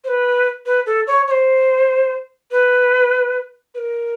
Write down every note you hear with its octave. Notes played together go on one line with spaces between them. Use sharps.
C5
B4
B4
A4
C#5
C#5
C5
B4
B4
A#4